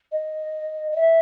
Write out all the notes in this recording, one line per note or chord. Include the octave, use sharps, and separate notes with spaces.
D#5
D#5
E5